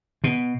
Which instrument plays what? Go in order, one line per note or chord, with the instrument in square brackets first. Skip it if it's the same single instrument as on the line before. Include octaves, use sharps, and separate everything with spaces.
[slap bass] B2